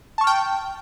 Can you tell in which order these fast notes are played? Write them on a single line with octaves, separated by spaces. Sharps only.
A5 C#6 F6 G5